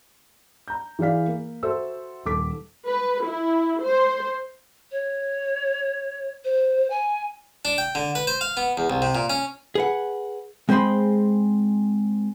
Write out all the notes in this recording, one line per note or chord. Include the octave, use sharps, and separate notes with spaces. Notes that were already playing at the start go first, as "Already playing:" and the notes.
A#5 G6
E3 G#4 D5 F5 B6
A#3
F#4 A4 C5 E5 E6
D#1 A4 D6 B6
B4
E4
C5
C#5
C5
G#5
D4
G5
D3
B4
C5
F5
B3
E2
C2
C3
A#2
C#4
G#4 B4 F#5
G#3 C4 G#4 C5 B5 C6